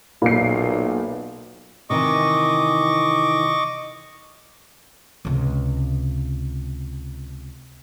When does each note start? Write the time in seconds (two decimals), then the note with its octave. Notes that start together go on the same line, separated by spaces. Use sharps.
0.22 B1 A#2 C7
1.90 C3 D#3 E3 D#5 C#6 D6
5.25 C#2 C3